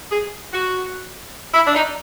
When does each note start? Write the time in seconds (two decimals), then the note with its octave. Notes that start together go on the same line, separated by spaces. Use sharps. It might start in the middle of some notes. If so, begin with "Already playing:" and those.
0.12 G#4
0.53 F#4
1.54 E4
1.67 D4
1.75 D#4